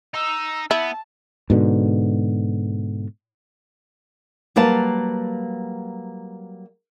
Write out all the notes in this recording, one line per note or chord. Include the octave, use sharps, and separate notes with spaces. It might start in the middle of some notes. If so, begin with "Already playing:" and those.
D#4 E6
B3 E4 A5
G#2 B2 D3
F#3 G3 A#3 B4 F5 A5